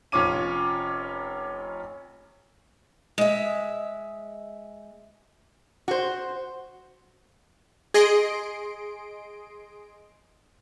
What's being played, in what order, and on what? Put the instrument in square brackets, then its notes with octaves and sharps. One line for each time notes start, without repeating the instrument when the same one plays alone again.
[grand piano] F1 C#4 F4 C#5 D6 D#7
[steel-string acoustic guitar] G#3 E5
[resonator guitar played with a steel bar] F#4 C5
[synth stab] G#4 D#5 C6 D7